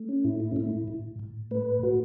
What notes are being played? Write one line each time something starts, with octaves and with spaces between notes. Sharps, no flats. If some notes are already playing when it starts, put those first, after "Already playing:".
Already playing: A3
C#4
A2 E4
E4
C#4
A2 E4
A2
A2
A3 B4
A2 F#4